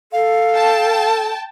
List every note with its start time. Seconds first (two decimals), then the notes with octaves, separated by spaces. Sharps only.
0.12 A4 F5
0.55 G5 A5